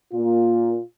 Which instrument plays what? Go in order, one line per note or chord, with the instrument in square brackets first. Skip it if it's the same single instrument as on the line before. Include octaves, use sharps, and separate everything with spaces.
[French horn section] A#2 A#3 F4